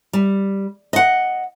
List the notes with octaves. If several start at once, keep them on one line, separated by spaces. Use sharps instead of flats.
G3
D#5 F#5